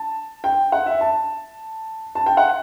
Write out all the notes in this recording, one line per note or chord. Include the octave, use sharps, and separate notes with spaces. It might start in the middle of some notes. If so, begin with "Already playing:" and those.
Already playing: A5
G5
F#5
E5
A5
A5
G5
F#5